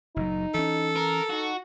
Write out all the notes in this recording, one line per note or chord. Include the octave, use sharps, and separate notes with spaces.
F#1 A#2 F#3 D#4
E3 C#4 A4
A#4
D#4 F#4